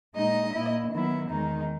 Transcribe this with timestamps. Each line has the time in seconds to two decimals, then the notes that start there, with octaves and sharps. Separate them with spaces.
0.14 A#2 G#3 D#4 D#5
0.53 A#2 A#3 E4
0.90 D#3 F#3 B3 E4
1.29 E2 D#3 G#3 D#4